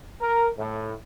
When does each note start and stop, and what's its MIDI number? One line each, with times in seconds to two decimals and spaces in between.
0.21 0.49 70
0.58 0.94 45